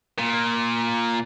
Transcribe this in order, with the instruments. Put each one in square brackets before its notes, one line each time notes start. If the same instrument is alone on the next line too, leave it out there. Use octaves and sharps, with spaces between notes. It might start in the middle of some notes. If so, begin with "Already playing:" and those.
[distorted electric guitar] A#2